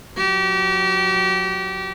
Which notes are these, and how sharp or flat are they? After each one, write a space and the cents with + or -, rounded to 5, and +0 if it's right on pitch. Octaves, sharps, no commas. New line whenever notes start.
F#3 -25 G4 -30